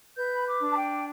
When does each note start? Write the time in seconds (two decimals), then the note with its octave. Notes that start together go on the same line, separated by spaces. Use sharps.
0.17 B4 G6
0.34 B5
0.46 D6
0.60 D4
0.70 A5
0.75 G5